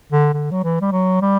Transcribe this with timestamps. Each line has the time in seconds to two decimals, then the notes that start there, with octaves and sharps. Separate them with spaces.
0.12 D3
0.34 D3
0.51 F#3
0.63 E3
0.81 G3
0.92 F#3
1.21 G3